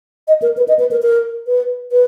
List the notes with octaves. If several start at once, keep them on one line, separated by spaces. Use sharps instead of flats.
D#5
A#4
B4
D#5
B4
A#4
A#4
B4
B4